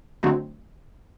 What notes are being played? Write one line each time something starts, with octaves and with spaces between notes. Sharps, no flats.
D3 F#3 A3 C4 D#4